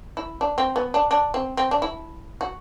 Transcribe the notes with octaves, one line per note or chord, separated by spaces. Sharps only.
E4
D4
C4
B3
D4
D4
C4
C4
D4
E4
F#4